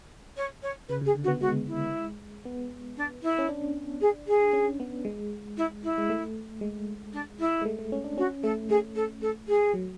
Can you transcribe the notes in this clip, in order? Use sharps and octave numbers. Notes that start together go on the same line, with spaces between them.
C#5
C#5
C#3 B4
C#3 G#4
D3
F#4
B3
G#3 F#4
E4
B3
D4
E4
C#4
D4
G#4
G#4
C#4
B3
G#3
E4
E4
G#3
A3
G#3
D4
E4
G#3
A3
A3
C#4
D4
C#4 F#4
A3 A4
A3 G#4
A4
A4
G#4
F#3